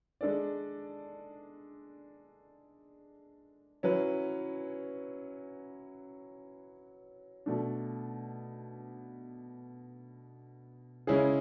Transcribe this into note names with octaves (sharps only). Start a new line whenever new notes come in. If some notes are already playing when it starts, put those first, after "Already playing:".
G#3 D4 A4 D5
F#3 C#4 E4 B4
B2 A3 D4
C#3 G#3 C#4 E4 G#4